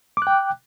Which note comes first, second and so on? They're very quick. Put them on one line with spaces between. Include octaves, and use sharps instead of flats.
D6 F#6 G5